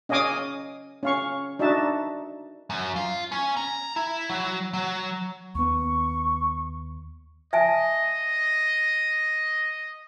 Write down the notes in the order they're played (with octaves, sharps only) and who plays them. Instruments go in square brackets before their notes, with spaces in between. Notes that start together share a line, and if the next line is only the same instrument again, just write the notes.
[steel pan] C#4 D#5 F5 G#5 D6 D#6
C#4 F5 C#6
D4 D#4 F#4 E5 A5
[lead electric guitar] F#2
F4
C#4
A#5
E4
F#3
F#3
[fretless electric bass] D#2 B3 [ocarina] C#6
[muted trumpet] D#5 [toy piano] E5 G#5 A5